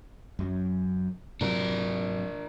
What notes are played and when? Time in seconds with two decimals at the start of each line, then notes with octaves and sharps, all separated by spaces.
0.39 F#2 F#3
1.41 G#2 C3 F#3 D4 A#4